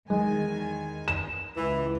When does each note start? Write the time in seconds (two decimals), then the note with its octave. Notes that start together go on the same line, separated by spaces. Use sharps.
0.10 E2 D#3 G#3 G#5
1.08 E7
1.57 C#2 E3